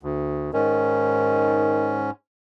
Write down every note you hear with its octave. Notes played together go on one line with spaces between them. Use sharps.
D2
G#2 D#3 C#4